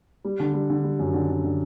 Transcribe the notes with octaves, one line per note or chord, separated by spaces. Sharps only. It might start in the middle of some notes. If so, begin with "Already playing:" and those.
G3
D3
G3
D3
G3
F#2
D3
D3
D3